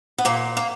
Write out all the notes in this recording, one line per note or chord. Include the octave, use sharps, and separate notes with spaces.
B3
A#2 A#3
A#3